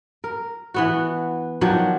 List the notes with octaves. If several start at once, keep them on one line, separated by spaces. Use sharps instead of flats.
A#4
E3 B3 F#4
D#3 F3 F#3 D4